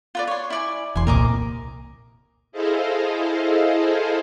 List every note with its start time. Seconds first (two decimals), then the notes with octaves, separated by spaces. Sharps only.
0.15 F4 B4 D5
0.27 C#5 C6
0.50 E4 D5 G#5
0.95 E1 E2 G#5 C6
1.07 C2 A#2 A#4 D#5 D6
2.52 E4 G#4 A4 C5 D#5 F5